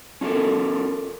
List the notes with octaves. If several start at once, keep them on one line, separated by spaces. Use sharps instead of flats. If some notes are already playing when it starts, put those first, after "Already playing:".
C#4 F4 G4 A4 A#4